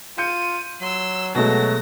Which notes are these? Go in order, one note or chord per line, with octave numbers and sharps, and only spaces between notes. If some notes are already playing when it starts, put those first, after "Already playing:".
F4 G6 C#7 D#7
F#3 C6 E6
B2 F#3 G#3 A3 A#6